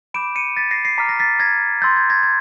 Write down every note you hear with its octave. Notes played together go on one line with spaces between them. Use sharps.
B5 D6 G6 D7 E7
C#7 D#7
A6 B6
A#6 C7
A#6 C7
A#5 D6 F6 B6
A#6
A6 B6
G#6 A#6
C6 E6 G6 A6
G#6
G#6 A#6
G#6